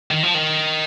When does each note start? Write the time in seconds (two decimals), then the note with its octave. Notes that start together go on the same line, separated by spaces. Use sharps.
0.11 D#3
0.23 F3
0.34 D#3